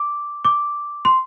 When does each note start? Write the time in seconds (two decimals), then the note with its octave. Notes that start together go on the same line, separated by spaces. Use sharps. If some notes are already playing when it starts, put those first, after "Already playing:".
Already playing: D6
0.45 D6
1.05 C6